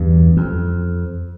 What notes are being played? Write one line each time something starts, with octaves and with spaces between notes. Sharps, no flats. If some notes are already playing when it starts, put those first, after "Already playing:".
Already playing: E2 G2
F2